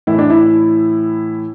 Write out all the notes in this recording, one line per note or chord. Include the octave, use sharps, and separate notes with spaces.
A2 E3 E4
D4
E4